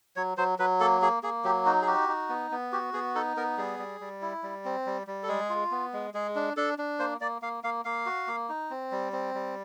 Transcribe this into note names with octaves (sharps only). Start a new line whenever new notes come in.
F#3 C#5
F#3 C5
F#3 B4
A#3 A4
A#3 G#4
A#3 G#4
F#3 G4
D#4 F#4
G#4
F#4 G4
D#4
B3
B3
F#4 G4
B3 G#4
D#4 A4
B3 A#4
G3 G#4
G3
G3
E4
G3
C4
G3
G3
A4
G#3 G#4
F4
B3
G#3
G#3 G#4
D4
D4 A4
D4
A#3 C5
A#3 D5
A#3 F5
A#3 F5
A#3 F5
F#4
A#3
D#4
C4
G3
C4
G3